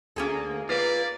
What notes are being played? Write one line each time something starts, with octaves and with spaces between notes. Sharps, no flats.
D2 A#3 C#4 G#4 A4
A#3 F4 B4 D5 F5